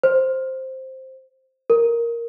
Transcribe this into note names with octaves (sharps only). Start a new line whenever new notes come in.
C5
A#4